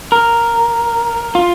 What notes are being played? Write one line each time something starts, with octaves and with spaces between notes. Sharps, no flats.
A#4
F4